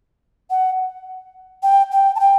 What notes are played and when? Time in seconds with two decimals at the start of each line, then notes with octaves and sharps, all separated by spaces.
0.50 F#5
1.63 G5
1.92 G5
2.15 A5
2.20 G5